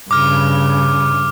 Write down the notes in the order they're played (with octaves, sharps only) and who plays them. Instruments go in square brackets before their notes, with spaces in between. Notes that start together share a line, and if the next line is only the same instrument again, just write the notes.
[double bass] G2 C#3 [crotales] D6 F6